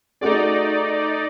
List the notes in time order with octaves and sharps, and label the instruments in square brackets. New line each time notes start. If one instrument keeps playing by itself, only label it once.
[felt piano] A3 F#4 G#4 [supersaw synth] D#4 D5